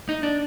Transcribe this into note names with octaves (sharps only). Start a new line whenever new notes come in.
D#4
D4